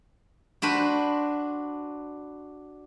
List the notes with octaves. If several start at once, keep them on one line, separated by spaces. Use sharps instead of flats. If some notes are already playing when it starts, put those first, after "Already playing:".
D4 F#4 B4 C5